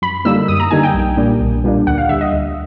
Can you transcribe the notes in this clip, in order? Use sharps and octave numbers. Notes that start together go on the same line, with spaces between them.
F#2 B5
D3 G3 A#3 D#4 E6
F#2 D#6
A#5
D3 G3 A#3 D#4 G#5
G5
B1
A#2 G3 A#3 D4
B1
A#2 G3 A#3 D4
D2 F#5
F5
D3 G3 E5
D#5
D2